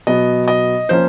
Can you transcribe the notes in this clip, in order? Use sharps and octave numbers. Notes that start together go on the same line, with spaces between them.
B2 F#3 B3 D#5
D#5
F3 A#3 C#4 C5